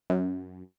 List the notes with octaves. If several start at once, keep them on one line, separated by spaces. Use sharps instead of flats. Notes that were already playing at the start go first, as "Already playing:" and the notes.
F#2